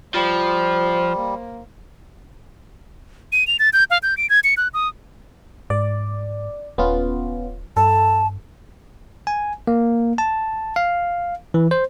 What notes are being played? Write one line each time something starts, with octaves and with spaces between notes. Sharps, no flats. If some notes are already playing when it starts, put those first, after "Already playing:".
F3 G3 C5
A#3
D#7
F7
A6
G6
F5
G6
D7
G#6
C#7
F#6
D#6
G#2 D5
D#1 B3 C#4 F4
G2 A4 A5
G#5
A#3
A5
F5
E3
C5